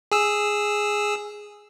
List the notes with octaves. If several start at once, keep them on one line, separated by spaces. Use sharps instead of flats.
G#4 E6